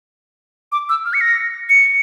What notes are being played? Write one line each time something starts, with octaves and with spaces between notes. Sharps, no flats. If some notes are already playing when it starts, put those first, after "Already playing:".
D6
E6
F6
C#7
A#6
C#7